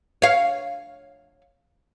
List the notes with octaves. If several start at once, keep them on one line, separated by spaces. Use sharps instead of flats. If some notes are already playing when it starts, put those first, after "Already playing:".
C#5 F5